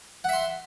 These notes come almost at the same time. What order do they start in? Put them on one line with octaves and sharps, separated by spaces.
F#5 E5 C6